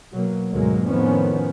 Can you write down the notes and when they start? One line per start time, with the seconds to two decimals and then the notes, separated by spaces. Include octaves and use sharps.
0.12 B2 F#3 A#3
0.50 D2 G#2 B2 F#3 G#3 A#3
0.86 F2 A2 D#3 F3 B3 C#4